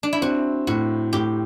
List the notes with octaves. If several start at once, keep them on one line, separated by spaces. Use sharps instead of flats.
D4
E4
C4 F#4
A2 F#4
A2 G4